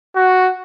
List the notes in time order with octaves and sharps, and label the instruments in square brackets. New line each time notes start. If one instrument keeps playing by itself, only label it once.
[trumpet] F#4